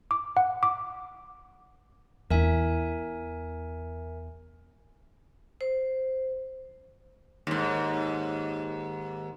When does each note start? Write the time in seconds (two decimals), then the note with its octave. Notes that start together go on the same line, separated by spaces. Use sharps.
0.11 D6
0.37 F#5
0.63 D6
2.30 E2 E4 A#4 E5 G#5
5.61 C5
7.47 D#2 G#2